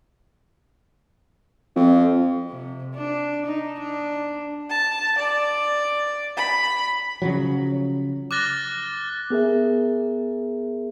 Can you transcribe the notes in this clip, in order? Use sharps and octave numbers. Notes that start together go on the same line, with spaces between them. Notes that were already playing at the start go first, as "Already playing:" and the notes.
F2
C3
D4
D#4
D4
A5
D5
B5
C#3 F3 F#3
D6 F6 F#6 A6 A#6 G7
B3 G#4 A#4 E5